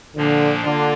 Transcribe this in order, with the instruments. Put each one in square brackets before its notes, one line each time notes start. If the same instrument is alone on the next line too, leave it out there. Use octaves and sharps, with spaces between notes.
[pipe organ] A#2 F3 A#3 D4 [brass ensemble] D3
[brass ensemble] D3 [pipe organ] A#3 F4